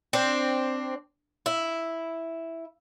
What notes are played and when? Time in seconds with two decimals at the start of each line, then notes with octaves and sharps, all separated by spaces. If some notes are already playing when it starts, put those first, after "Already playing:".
0.13 C4 D4
1.46 E4